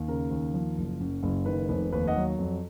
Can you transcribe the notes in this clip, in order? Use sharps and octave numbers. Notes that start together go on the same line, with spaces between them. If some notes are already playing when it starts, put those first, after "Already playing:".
Already playing: D#2
C#3 A#4
D#2
F3
F#1
F#2
F#1
D#3 B4
F1 B4
D#2 B4
D#5 F#5
F#3
F2